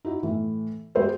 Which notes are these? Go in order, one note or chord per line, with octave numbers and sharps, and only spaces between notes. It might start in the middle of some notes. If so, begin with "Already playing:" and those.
D#4 E4 F#4
A2 E3
G#3 F#4 G4 C5 E5